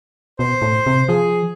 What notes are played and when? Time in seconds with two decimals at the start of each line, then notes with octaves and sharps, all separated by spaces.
0.39 B2 C5
0.62 A2
0.86 C3
1.09 F3 G#4